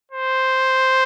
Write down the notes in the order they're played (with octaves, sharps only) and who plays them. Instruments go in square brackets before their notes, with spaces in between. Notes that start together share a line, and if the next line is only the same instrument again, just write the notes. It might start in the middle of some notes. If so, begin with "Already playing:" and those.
[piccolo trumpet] C5